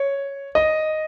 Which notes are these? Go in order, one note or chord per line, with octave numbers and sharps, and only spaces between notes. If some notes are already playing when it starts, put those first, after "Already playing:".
Already playing: C#5
D#5